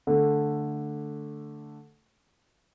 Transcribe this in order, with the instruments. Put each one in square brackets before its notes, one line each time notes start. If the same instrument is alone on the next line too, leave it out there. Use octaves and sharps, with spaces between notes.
[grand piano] D3 A3